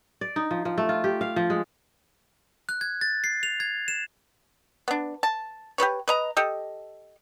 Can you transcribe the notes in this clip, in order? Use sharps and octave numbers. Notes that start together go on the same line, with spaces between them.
D5
D#4
F3
F3
A3
F4
G4
F5
F3
G#3
F#6
G#6
A6
C7
F7
G#6
E7
B3 D4
A5
G4 A4 B4 C#5
B4 D#5 A#5
G4 A4 D#5